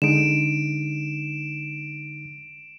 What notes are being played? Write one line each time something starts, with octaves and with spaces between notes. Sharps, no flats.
D3 G#3 D#4 D7 E7